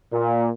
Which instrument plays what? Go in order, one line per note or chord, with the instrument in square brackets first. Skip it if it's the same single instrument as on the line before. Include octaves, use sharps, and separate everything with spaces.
[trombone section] A#2